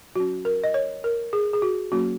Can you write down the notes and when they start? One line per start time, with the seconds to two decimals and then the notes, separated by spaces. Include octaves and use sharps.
0.16 F#3 C#4 F#4
0.45 A#4
0.64 D#5
0.74 C#5
1.04 A#4
1.33 G#4
1.53 G#4
1.62 F#4
1.92 F#3 A#3 C#4 F#4